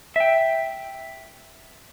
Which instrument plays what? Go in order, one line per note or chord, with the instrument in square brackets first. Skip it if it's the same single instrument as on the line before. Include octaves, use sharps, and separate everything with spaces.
[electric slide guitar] E5 G5